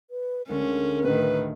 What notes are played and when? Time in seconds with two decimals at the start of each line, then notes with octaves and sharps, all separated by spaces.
0.11 B4
0.49 D2 G#3 A3 C#4 A#4
1.05 A2 D#3 B4